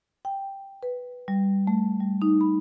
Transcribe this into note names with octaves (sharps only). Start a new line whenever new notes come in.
G5
B4
G3
A3
G3
D#4
B5